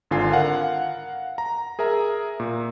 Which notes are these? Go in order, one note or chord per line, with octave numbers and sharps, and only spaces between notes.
G#1 D3 F4 G#5 C7
A#4 F5 F#5
A#5
G#4 A#4 E5 A#5
A#2